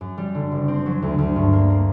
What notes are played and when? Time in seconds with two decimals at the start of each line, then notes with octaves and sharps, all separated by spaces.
0.01 F#2
0.18 G3
0.35 D3
0.52 F#1
0.68 C4
0.86 F#3
1.02 D2
1.18 D2
1.36 G2
1.53 A#3
1.70 A#3